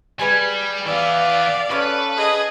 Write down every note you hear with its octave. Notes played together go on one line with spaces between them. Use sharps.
G3 G#4 B4 G#5
E3 B3 D5 F5
C#4 A4 B4
G#4 D#5